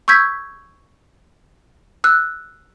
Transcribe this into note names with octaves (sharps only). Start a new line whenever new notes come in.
C#6 E6 G6 G#6 B6
E6 F#6